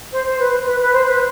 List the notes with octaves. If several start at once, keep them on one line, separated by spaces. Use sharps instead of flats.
C5
C5
B4
B4
B4
C5
B4